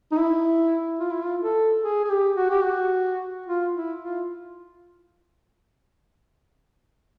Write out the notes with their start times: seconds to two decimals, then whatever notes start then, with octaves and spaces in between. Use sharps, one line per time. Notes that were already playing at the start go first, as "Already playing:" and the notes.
0.12 D#4
0.17 E4
0.99 F4
1.11 E4
1.23 F4
1.41 A4
1.82 G#4
2.04 G#4
2.10 G4
2.36 F#4
2.50 G4
2.62 F#4
3.46 F4
3.74 E4
4.01 F4